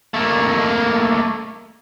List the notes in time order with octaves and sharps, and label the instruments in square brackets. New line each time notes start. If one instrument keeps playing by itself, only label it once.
[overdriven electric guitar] A3 A#3